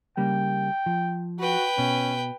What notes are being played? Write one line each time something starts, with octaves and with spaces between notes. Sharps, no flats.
C#3 G3 A#3 G5
F3
F#4 B4 G5
B2 C#4